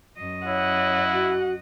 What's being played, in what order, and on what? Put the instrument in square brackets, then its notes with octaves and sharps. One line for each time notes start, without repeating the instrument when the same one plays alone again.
[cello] F#2 D#5
[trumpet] E4 [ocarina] C#5 [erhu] F#5
[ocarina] F#4